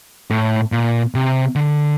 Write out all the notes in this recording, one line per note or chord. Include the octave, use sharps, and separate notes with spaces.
A2
A#2
C3
D3